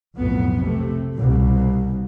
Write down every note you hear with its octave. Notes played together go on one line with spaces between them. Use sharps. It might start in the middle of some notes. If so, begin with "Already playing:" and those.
B1 F2 A2 F#3 B3
C3 A3
C2 B2